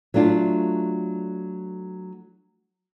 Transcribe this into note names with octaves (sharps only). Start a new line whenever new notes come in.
F#3 A3 D4 F4